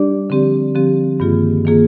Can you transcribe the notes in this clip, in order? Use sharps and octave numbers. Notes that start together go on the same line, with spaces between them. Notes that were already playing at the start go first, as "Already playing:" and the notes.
Already playing: G3 D4 G4 D5
D3 F3 C4 G4
D3 F3 C4 G4
G2 D#3 A#3 F4 G#4
D#3 A#3 F4 G#4